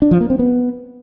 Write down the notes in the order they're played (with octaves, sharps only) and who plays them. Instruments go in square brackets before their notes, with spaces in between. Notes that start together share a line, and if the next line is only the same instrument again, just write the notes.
[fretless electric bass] D4
F3
A#3
C4
B3